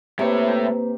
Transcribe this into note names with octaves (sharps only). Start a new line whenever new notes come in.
A2 C3 A#3 B4 C#5